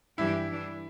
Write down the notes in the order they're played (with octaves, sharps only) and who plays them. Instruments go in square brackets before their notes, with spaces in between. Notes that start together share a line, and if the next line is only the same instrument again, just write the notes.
[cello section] G2 E3 G3 D4 G4 [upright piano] E4
[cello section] E3 G3 D4